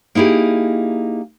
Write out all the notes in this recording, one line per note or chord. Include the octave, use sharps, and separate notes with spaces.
A#3 D#4 E4 G4 G#4